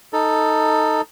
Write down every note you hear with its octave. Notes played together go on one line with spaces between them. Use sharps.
D#4 A4